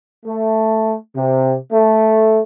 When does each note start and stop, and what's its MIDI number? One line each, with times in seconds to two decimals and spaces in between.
0.25 0.94 57
1.15 1.54 48
1.71 2.39 57